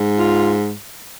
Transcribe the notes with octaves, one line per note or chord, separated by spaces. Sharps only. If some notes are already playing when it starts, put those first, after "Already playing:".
Already playing: G#2
F4